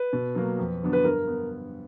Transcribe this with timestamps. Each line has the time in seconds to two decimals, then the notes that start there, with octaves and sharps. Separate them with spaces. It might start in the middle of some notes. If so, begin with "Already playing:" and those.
Already playing: B4
0.13 B2
0.35 F#3 A#3
0.59 F2
0.82 D3 F#3 B3 D4
0.93 B4
1.04 G2 A#4
1.27 B3